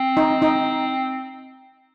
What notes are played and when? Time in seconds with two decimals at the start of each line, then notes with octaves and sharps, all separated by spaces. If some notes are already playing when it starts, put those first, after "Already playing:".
Already playing: C4
0.17 D#4
0.42 D#4